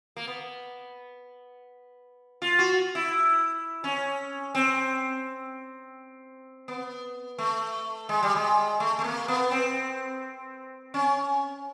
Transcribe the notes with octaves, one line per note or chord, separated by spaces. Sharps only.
A#3
B3
F4
F#4
E4
C#4
C4
B3
A3
G#3
G3
G#3
A3
A3
A#3
B3
C4
C#4